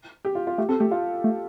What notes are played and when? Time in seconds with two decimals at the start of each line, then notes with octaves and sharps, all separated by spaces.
0.25 G4
0.35 F4
0.47 F4
0.58 A3 G4
0.69 C4 A4
0.80 A3 G4
0.91 F4
1.24 A3